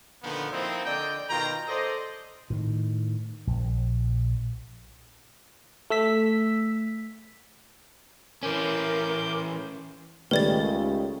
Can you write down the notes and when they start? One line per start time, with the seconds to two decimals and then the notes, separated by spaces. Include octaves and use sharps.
0.23 A#2 D3 D#3 F3 B3
0.51 F3 A#3 C4 D#4 E4
0.85 D3 D5 D#5 G5
1.28 B2 D#3 F4 G5 A#5
1.67 A4 C5 D5 D#5
2.50 A2 D#3
3.47 A#1
5.90 A3 E6 B6
8.43 E3 C#4 A#4 D6 G6
10.31 C#2 D#3 G3 A3 B4 D5 A6